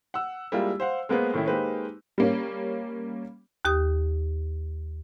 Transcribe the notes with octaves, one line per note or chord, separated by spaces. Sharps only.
F#5 E6
G3 G#3 A#3 E4 F4
C5 F5 F#5
G#3 A#3 B3 G#4 B4 C5
A2 D#3 C#4 E4
G#3 A#3 D#4 G4 B4 C5
G3 A#3 C#4
D#2 G4 D#6